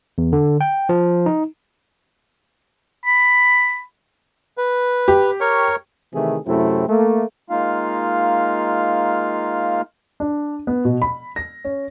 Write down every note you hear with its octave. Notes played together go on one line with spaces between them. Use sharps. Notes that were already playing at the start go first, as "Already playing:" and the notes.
E2
D3
G5
F3
D#4
B5
B4
G4
A#4 C#5 C#6
C3 D#3 E3 A3 E4 G#4
F#2 C3 A3 C4 E4
A3 A#3 A4
G#3 A#3 D#4 F4 F5
D4
B3
B2
B5
A#6
C#4